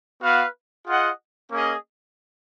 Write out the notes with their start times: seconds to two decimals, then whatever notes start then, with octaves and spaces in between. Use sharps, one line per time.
0.22 B3 F#4 B4 F5
0.87 F4 G#4 D#5 F#5
1.52 A#3 C#4 G#4 D#5